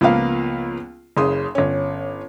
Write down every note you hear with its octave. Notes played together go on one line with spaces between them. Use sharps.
C#2 F3 A#3 B3 F5
F#1 C#3 C6 D#6
G1 C#4